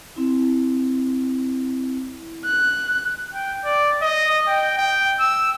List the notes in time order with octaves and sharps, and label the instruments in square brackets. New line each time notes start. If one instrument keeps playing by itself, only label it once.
[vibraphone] C4 E4
[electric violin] F#6
[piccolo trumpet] G5
D5
D#5
G5
G5
E6